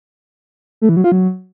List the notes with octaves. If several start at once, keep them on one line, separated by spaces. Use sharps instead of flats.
A3
E3
F#3
F4
F#3